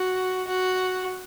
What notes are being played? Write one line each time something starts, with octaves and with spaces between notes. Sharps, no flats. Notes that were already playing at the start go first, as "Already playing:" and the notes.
Already playing: F#4
F#4